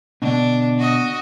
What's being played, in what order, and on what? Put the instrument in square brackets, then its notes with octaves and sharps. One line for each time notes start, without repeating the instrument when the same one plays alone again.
[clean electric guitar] B2 D3 [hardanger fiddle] D4
[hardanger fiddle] F#4 D#5